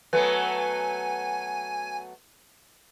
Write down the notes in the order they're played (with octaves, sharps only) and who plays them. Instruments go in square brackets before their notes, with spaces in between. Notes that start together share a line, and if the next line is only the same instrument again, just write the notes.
[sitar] F#3 A3 B3 [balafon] B4 [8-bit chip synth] G#5